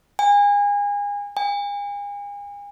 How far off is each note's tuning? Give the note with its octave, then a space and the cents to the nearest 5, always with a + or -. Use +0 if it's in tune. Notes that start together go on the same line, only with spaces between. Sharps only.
G#5 -30
G#5 -40